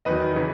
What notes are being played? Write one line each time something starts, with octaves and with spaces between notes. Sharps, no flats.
E2 D#3 F#3 B4 D#5
C#3 E3